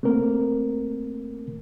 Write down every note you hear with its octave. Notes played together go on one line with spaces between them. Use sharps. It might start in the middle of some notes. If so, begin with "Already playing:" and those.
A3 A#3 C4 A#4